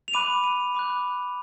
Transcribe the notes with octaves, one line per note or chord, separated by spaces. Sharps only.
F7
B5 D6 F#6 D#7
D#7
B5 D6 F#6